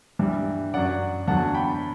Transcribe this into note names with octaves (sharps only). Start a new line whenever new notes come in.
G2 E3 G3
F#2 F#3 D5 F#5
E2 D3 F#3 F#5 A5
G5 B5